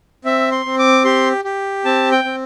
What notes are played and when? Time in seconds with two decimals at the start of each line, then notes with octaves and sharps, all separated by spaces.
0.25 C4 E5
0.52 C6
0.66 C4
0.79 D6
1.05 G4 C6
1.45 G4
1.85 C4 A5
2.12 G5
2.25 C4